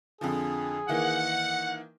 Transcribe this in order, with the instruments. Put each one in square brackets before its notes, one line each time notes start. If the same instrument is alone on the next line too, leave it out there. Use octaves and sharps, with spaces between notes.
[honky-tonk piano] F2 D3 F3 [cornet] G#4
[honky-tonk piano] D#3 E3 A#3 [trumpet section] F#5